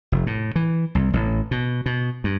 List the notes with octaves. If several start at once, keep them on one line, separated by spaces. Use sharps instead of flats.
F1
A2
E3
C2
A1
B2
B2
G2